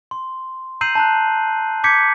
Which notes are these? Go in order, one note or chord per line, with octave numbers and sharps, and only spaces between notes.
C6
A#5 E6 G6 C7 D#7 F#7
A5 A#5 F#6
D6 G6 G#6 B6 C#7